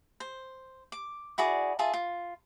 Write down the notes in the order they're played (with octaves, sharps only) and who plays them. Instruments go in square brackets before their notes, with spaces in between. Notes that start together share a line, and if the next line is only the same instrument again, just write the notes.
[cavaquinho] C5
D6
E4 F#4 G#4 D5
F4 G#4 E5 A5
F4